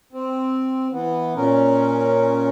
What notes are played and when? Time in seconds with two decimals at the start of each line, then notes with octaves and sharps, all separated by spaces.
0.13 C4
0.92 E3 B3
1.36 A#2 C#4 A#4